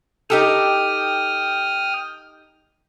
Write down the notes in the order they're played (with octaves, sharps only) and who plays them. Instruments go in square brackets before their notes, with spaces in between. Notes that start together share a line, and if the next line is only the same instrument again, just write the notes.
[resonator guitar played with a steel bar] D#4 G4 A4 [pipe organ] G5 D#6 F6